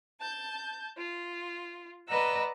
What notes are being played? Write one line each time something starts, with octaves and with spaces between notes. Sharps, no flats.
A5 G6
F4
B4 D5 D#5 F#5 A#5 E6